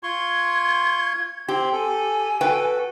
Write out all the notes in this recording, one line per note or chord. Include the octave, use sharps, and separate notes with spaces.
F4 C6 C#6 G#6
C4 G4 C6
A4 G#5
F#4 A4 B4 G5